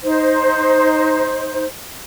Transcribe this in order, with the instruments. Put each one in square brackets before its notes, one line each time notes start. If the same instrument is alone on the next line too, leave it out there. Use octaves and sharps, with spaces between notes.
[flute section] D#4 C5